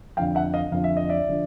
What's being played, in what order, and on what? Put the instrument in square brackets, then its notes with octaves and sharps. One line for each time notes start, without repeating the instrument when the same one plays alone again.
[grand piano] F2 D3 F3 F5 G5
E5 F#5
D#5 F5
F2 D3 F3 F5
E5
D#5
D5 E5
D3 F3